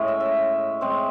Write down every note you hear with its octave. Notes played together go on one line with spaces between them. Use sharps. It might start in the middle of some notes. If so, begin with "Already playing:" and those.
Already playing: A2 G#3 C#4
E5
E5
A2 G#3 C4